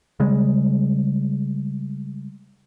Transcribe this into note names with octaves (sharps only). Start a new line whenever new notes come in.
C#3 G3 G#3